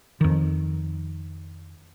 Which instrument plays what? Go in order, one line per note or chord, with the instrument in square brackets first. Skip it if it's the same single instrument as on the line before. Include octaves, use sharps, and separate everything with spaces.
[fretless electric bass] F2 D#3